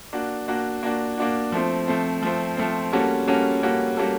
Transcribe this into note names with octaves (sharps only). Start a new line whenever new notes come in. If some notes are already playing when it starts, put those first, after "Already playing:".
A#3 D4 F#4
A#3 D4 F#4
A#3 D4 F#4
A#3 D4 F#4
F3 A3 C4
F3 A3 C4
F3 A3 C4
F3 A3 C4
G3 A#3 C#4 F#4 A4
G3 A#3 C#4 F#4 A4
G3 A#3 C#4 F#4 A4
G3 A#3 C#4 F#4 A4